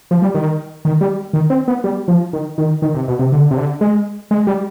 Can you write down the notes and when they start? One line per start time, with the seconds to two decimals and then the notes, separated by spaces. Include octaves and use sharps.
0.11 F3
0.22 G3
0.34 D#3
0.85 D#3
1.01 G3
1.33 D#3
1.50 C4
1.68 B3
1.84 G3
2.08 F3
2.33 D#3
2.58 D#3
2.82 D#3
2.94 C3
3.08 B2
3.19 C3
3.32 D3
3.51 C3
3.57 D3
3.81 G#3
4.31 G#3
4.47 G3